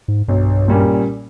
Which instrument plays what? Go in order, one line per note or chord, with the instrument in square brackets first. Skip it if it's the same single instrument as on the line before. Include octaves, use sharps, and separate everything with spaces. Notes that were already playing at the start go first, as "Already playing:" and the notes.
[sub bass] G#2
[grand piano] B1 [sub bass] G2
[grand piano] A#2 G3 A#3 C#4